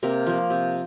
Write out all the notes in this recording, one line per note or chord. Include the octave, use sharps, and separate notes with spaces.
C3 A#3 A#4
F3 A#3
C3